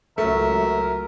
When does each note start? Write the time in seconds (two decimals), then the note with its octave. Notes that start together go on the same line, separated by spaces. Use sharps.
0.18 C#2 F#3 A3 A#4 E5